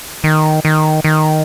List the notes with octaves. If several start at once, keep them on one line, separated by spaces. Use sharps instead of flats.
D#3
D#3
D#3